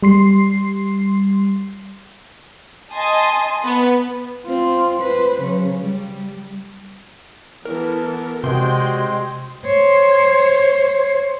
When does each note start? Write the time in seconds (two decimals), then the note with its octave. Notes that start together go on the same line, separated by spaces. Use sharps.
0.02 G3 C6 C7
2.93 D#5 G#5 A5 C6 D#6
3.64 B3
4.46 C4 F4
5.01 B4 C5
5.41 C#3 F#3
5.80 G3
7.65 E3 B3 A4 A#4
8.44 C3 G3 G#3 C4 F#4 G5 C6
9.65 C5 C#5